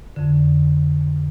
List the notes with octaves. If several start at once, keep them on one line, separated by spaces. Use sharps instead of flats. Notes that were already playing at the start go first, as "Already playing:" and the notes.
F2 D3